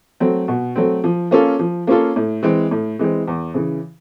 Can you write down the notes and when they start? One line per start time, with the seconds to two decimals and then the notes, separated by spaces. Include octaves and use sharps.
0.20 F#3 A3 C4
0.48 B2
0.76 F#3 A3 C4
1.04 F3
1.31 A#3 C#4 F4 A4
1.59 F3
1.87 A#3 C#4 F4 A4
2.16 A2
2.43 E3 G#3 C4
2.71 A2
2.99 E3 G#3 C4
3.28 E2
3.54 C#3 E3